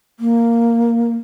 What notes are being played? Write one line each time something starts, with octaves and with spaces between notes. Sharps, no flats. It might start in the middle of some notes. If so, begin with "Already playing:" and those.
A#3